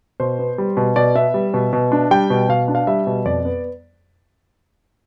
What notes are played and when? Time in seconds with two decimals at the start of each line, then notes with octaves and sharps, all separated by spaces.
0.20 B2 C5
0.39 B3
0.58 G3
0.77 B2
0.96 B2 D5
1.15 B3 E5
1.34 G3
1.54 B2
1.73 B2
1.92 D4
2.11 G3 G5
2.30 B2
2.49 B2 F5
2.68 D4
2.75 F5
2.87 G3 E5
3.07 B2
3.25 F2 D5
3.45 B3